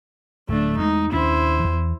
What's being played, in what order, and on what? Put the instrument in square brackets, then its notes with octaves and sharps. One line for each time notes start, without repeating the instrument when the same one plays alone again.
[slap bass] D1 A2 [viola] A3 D4
[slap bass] E2 G#3 [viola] D#4
[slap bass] D#2 C#4 D4 [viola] E4 C5
[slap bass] E2 E3